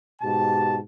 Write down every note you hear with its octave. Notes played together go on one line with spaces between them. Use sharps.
G#2 B2 G4 A5